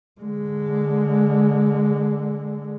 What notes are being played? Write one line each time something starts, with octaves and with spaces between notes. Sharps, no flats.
D3 G#3